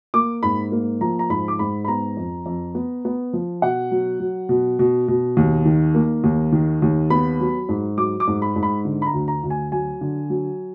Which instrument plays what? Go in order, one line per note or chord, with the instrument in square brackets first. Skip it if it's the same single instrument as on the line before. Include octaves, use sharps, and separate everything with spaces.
[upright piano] A#3 D6
G#2 B5
A#3
F3 A#5
A#5
G#2 B5
D6
G#2 B5
B5
B3 A#5
F2
F2
B3
B3
F3
B2 F#5
F#3
F#3
B2
B2
B2
D#2
D#3
A#3
D#2
D#3
D#2
B3 B5
F#3
G#2
F#3 D6
D6
G#2
B5
G#2
B5
D3
B5
A#5
D2
A#5
D2
G#5
F#3 G#5
D3
F#3